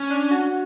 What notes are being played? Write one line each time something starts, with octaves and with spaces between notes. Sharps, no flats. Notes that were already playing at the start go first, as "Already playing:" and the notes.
Already playing: C#4
D4
F#4